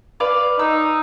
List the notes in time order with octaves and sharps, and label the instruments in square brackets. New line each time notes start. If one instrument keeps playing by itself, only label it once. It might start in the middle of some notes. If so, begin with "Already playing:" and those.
[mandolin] B4 D5 F5
[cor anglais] D#4 [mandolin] E6